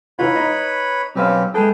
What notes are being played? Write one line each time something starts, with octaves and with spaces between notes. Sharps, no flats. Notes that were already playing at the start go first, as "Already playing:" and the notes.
E3 D#4 F4 B4 C#5 B5
D#4 D#5
B1 C4 C#4 G4 B4 F5
G#3 G#4 A4 B4 G5